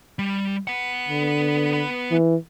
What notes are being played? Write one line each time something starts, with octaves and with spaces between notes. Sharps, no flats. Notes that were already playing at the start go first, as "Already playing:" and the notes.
G3
B3 F#5
D3
E3